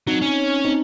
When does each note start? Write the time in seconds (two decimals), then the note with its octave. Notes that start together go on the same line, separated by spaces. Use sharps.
0.07 F#3 C4 D#4
0.22 C#4
0.65 C4 D#4